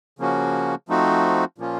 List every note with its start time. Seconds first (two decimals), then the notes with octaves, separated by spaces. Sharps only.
0.19 C#3 F3 A#3 C#4 F#4
0.89 F3 A3 C4 D#4 F#4
1.58 A#2 F3 A#3 C#4 F4